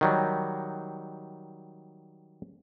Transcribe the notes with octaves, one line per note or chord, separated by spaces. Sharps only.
D#3 F#3 G3